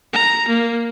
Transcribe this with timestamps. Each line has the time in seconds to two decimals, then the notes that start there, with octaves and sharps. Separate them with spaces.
0.13 A#5
0.49 A#3